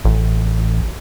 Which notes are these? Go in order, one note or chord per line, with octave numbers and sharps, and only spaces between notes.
A1